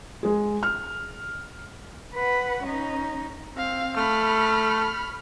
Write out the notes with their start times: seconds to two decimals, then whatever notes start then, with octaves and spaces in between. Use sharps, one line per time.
0.23 G#3 G#4
0.63 F6
2.15 B4 F#5
2.63 C#4 D#4
3.55 C4 F5
3.97 A3 B5 F6